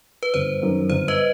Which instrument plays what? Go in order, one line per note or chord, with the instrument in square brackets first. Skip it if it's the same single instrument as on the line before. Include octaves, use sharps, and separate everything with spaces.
[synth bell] B4
[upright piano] G1 [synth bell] C5
[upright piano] F#2 D#3
[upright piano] G1 [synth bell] C5
[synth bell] B4 D#5